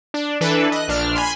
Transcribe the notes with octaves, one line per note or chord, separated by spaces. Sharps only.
D4
E3 D4 A4 B4
D#5 F#6
A#1 D4 F6
G#5 B5 C6